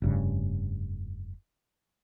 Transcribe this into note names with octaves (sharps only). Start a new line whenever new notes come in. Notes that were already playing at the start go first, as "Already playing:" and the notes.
F1 G2 C#3